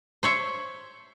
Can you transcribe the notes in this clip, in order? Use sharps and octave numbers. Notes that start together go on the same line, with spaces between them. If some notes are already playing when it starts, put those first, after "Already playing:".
C5 C#5 E5